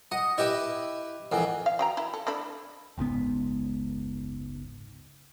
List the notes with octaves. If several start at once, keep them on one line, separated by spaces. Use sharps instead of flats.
D#5 F#5
E4 G4 B4 D#5 G5
F2 E3 A#4 F#5 G#5
F5
F#3 G5 A#5
E4
A4
A3 D4 E4
F#1 C#2 G#2 B3